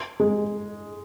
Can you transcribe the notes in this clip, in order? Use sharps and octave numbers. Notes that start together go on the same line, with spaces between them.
G#3